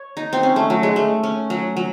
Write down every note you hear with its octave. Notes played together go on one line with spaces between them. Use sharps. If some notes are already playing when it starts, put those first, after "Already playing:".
Already playing: C#5
D#4
C4
C#4
A3
F#3
G#3
A3
C#4
F#3
F#3